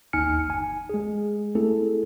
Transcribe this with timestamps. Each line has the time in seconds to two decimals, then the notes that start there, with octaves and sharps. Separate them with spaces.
0.13 A1 D#2 D#4 G#5 F6 C#7
0.48 G1 G#5
0.90 G#3 G#4
1.55 A3 C4 E4 G#4 A4